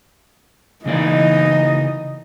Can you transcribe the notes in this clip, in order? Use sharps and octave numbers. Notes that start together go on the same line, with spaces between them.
C#3 E3 A#3 D#4 D5 D#5